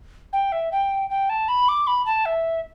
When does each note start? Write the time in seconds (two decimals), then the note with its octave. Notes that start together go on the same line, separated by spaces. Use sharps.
0.32 G5
0.52 E5
0.71 G5
1.09 G5
1.29 A5
1.48 B5
1.68 D6
1.87 B5
2.05 A5
2.25 E5